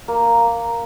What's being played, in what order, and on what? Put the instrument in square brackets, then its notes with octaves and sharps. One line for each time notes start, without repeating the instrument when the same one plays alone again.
[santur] A#3